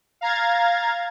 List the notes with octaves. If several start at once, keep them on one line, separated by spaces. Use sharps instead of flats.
F5 A#5 G#6 A6